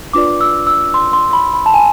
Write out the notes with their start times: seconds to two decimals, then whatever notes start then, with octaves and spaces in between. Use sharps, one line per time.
0.13 D4 F4 B4 D5 D6
0.41 E6
0.67 E6
0.94 C6
1.13 C6
1.33 B5
1.54 B5
1.66 A5
1.74 G#5